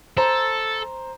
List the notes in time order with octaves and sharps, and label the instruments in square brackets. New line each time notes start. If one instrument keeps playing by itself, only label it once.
[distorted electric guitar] A4 [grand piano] C5 A#5